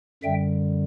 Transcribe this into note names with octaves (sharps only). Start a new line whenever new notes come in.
F#2 D3 G3 E5 G5